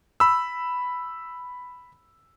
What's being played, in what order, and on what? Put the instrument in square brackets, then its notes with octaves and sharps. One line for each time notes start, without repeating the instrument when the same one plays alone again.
[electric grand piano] B5 E6